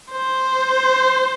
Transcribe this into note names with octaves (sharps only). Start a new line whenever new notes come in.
C5